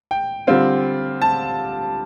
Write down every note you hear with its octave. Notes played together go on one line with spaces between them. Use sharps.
G5
D3 G3 C4 F4
A5